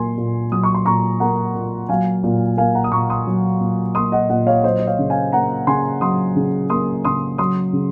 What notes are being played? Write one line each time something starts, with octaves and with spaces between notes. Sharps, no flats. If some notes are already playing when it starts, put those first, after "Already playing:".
Already playing: A#2 F#3 A#3 G#5 C6
A#2
F#3 D#6
C#6
C6
A#2 A#5 C#6
A#3 F#5 A#5
A#2
F#3 F5 G#5
A#2
A#3 F5 G#5
F#5 A#5
D#6
A#2 A#5 C#6
C6 D#6
F#3
A#2
A#3 C6 D#6
D#5 F#5
A#2 D#5 F#5
C#5 F5
F#3 C5 D#5
D#5
C#5 F5
C#3
F5 G#5
A#3 F#5 A#5
C#3 G#5 C6
F#3 C6 D#6
C#3
A#3 C6 D#6
C#3 C6 D#6
F#3 C6 D#6
C#3